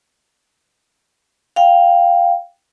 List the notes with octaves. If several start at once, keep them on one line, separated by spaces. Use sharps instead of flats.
F5 G5